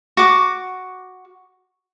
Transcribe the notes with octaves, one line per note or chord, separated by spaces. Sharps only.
F#4 D6